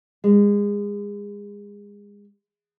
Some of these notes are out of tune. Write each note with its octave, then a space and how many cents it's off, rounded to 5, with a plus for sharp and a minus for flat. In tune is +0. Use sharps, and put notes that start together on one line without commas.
G#3 -30